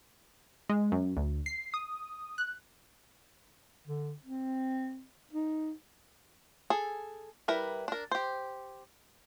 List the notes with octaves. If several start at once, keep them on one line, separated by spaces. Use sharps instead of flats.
G#3
F#2
D2
C7
D#6
F#6
D3
C4
D#4
G#4 A4
G3 E4 A#4 B4
D4 A#4
G4 C5